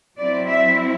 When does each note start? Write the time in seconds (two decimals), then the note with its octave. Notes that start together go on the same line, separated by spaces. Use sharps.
0.17 F#3 C4 E4 D5
0.47 E5